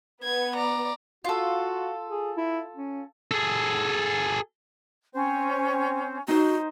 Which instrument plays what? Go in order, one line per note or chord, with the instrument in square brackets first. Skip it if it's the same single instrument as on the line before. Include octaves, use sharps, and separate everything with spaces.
[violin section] B3 [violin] G#6
[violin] D5 A#5
[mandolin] F4 A4 [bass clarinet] F#4
[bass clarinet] G#4
E4
C#4
[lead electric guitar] G#4 A4
[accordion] C4 C5 [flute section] C#4
[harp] D#4 C5 [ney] F#4